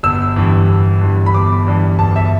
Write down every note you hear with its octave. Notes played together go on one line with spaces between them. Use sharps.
G1 E6
G2 E3
G1
G2 E3
B5
G1 D6
G2 E3
G1 A5
E5